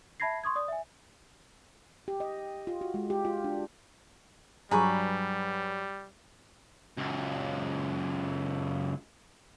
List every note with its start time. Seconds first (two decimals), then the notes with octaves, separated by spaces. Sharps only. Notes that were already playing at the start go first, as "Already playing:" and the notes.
0.20 E5 A5 B5 G#6 A#6 C7
0.44 C6 C#6 D#6 G#6
0.56 D5 D#6
0.68 E5 G#5
2.08 G4
2.20 D#5
2.67 F4
2.81 F#4
2.94 G#3
3.10 G4
3.25 F4
3.44 D4
4.71 G2 F#3 G3 G#4 B4 A#5 C#6
6.97 C#2 F#2